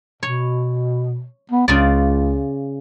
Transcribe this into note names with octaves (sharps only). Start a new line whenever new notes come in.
B2 C#5
B3
C#2 C#3 F4 D5